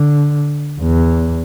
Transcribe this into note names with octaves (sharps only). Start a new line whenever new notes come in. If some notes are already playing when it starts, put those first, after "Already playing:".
Already playing: D3
E2